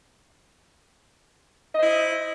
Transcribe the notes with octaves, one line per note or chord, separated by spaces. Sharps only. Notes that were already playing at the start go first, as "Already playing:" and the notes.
E4 C5 D#5